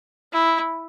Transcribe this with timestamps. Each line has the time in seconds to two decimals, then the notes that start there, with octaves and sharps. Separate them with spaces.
0.33 E4